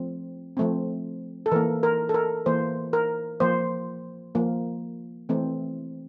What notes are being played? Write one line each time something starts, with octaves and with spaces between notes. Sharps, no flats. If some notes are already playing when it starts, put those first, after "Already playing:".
Already playing: F3 A3 C4
F3 A3 C4
A4
E3 A#3 A#4
A#4
A4
A#4
E3 A#3 C5
A#4
F3 A#3 C5
F3 A#3
E3 A3 C4